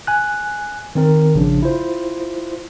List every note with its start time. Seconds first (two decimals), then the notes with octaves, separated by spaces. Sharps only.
0.07 G#5 F#6
0.95 D#3 C4 A#4
1.34 A1 C#3 F3 D4
1.62 E4 F4 C5